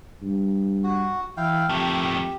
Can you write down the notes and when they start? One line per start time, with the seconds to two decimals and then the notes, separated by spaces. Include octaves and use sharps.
0.22 G2
0.84 F#4
1.37 E3 E4 F5 G5
1.69 F2 D#3 A3 G4